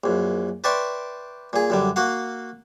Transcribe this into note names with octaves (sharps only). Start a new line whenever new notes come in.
A#1 F#2
B4 D5 E5 G5 C6 C#6
A#2 G#4
F#2 D3 G3
A#3 F#4 F5 F#5